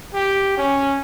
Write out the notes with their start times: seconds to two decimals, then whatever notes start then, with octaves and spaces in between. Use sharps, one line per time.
0.14 G4
0.57 C#4